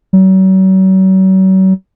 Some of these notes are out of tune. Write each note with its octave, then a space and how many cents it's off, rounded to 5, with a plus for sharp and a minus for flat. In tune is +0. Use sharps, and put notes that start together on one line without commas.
F#3 +40